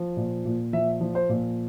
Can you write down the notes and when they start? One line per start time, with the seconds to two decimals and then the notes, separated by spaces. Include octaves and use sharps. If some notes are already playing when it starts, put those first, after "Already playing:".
Already playing: F3
0.17 A#2
0.45 A#2
0.73 F3 E5
1.01 F3
1.15 C5
1.29 A#2